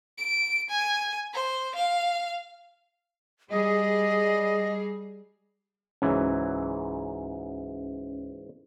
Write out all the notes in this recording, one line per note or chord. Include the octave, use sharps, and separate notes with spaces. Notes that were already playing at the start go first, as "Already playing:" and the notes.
D7
G#5
C5
F5
G3 G#4 D#5
C#2 G#2 E3 F#3 C#4